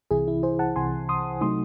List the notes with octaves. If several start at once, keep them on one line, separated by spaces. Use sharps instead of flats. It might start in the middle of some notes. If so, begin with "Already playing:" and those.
C2 C3 E3 E4 G#4
E4
G#4 C5
F#5 A5
C2 C3 E3 G#5 C6
C6 D#6
C3 F#3 A3 D#4 C6 D#6